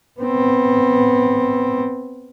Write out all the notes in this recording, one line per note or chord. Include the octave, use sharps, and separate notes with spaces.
B3 C4